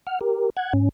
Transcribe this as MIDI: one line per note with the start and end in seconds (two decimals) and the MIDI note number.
0.07 0.19 78
0.07 0.19 89
0.21 0.50 67
0.21 0.50 70
0.57 0.73 78
0.57 0.73 90
0.57 0.73 92
0.73 0.89 44
0.73 0.89 61